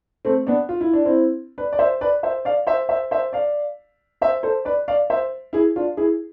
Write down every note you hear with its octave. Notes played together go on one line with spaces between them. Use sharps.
A3 C4
B3 D4
F4
E4
D4
C4 E4
B4 D5
D5
C5 E5
B4 D5
C5 E5
D5 F5
C5 E5
C5 E5
C5 E5
D5 F5
C5 E5
A4 C5
B4 D5
D5 F5
C5 E5
E4 G#4
D4 F4
E4 G#4